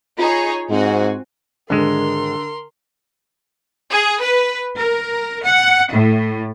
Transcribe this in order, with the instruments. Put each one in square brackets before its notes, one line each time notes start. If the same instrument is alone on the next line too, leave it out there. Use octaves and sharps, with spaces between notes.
[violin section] D#4 G#4 C#5 [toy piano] F4 A#5
[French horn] G#2 [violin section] C4 F#4 G#5
[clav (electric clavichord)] G#1 G#3 [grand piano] D3 [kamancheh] A#4 C6
[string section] G#4
B4
A#4
F#5
A2